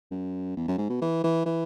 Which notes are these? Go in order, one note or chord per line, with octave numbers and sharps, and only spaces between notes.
F#2
E2
F#2
G#2
B2
E3
E3
E3